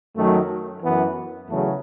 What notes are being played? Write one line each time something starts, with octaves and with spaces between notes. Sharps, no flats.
F#2 D#3 F#3 A3
F#2 E3 B3
E2 C#3 F#3 A3